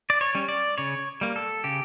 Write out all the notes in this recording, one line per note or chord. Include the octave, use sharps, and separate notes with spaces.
D5
C#5
G3 C#4
D5
C#3 C#5
G3 A#3
A4
C#3 G4